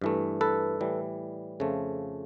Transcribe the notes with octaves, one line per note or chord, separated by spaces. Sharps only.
G2 E3 A3
A4 B4
A2 E3 G3
F2 C#3 F3 A3